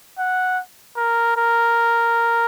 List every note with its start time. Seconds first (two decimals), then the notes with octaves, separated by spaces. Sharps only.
0.18 F#5
0.97 A#4
1.37 A#4